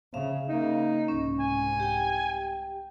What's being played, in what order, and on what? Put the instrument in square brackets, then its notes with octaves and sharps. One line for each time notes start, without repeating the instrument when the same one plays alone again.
[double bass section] C#3 [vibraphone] E5 F5
[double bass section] C#3 A#3 [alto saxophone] D#4
[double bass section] C2 G#2 [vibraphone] C#4
[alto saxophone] G#5
[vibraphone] G4 G5